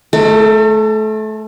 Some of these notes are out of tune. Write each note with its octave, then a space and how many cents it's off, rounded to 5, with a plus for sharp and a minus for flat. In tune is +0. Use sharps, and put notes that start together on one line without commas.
A3 -25 A4 +40